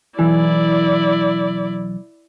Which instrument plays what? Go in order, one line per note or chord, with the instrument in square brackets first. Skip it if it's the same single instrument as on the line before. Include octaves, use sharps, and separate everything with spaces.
[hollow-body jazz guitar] B1 E3 [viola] E4 D5